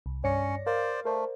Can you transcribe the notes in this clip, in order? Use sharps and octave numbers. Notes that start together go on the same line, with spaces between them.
C2
G2 C#4 C#5 D5 A#6 C#7
A#4 C5 D5 F5
A3 A#4 C5 D5